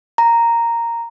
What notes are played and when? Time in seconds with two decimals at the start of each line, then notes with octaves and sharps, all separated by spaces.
0.18 A#5